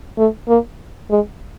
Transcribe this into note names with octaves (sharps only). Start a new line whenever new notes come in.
A3
A#3
G#3